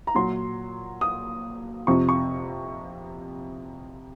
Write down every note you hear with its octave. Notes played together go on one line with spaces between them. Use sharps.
A#5
A#2 F#3 C6
D#6
F2 C3 F3 C#6
C#6